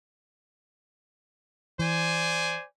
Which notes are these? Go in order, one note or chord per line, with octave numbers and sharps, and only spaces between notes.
E3 C5 D5 G#5